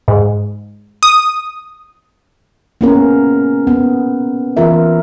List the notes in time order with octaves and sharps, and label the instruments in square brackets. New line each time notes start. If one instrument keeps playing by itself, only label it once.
[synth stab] G#2
D#6
[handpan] A#3 B3 C#4 E4 A#4
B3
E3 B3 F4 A#4 E5